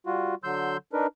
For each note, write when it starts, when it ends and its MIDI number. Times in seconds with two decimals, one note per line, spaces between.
0.06 0.35 55
0.06 0.35 65
0.06 0.35 66
0.44 0.77 50
0.44 0.77 54
0.44 0.77 84
0.44 0.77 88
0.44 0.77 91
0.93 1.07 62
0.93 1.07 63
0.93 1.07 70
0.93 1.07 71